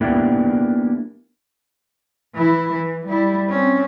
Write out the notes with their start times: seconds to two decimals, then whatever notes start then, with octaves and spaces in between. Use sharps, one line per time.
0.01 A#3 B3 D4 E4 G4
2.35 E3 E4
2.73 E3
3.06 G3 E4
3.49 C4 C#4